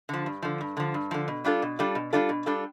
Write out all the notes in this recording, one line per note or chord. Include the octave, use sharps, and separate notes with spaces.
D3 F3
G2
D3 F3
G2
D3 F3
G2
D3 F3
B2
G3 D4 F4 A4
B2
G3 D4 F4 A4
B2
G3 D4 F4 A4
B2
G3 D4 F4 A4